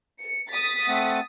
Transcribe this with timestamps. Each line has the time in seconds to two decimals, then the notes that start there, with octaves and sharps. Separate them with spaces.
0.21 C#7
0.50 D#6 A6 B6
0.87 A3 C4 F#5